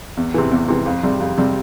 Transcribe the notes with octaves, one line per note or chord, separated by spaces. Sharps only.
E2
C3 E3
E2
C3 E3
F2
C3 G3
F2
C3 G3